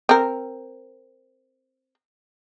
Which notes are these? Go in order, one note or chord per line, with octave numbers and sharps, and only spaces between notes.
C4 A#4